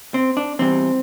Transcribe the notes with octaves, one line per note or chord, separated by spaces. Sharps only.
C4
D4
E2 E3 G3 C4